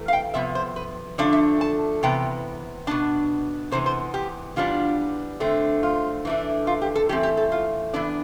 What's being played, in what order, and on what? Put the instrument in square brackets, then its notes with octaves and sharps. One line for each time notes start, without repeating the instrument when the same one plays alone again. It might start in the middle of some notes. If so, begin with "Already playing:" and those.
Already playing: [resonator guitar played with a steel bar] C3 E3 A3
F5
G5
C3 F3 B3 E5
C5
B4
D3 F3 A3 D4 D5
E5
A5
C3 E3 B3 G5
B2 B3 D4 A5
C3 E3 B3 C5
C5
G4
E3 G3 B3 D4 F4
D3 A3 C4
F4
E3 A3 D4
F4
G4
A4
E3 A3 C4 G4
G4
A4
F4
E3 B3 D4 E4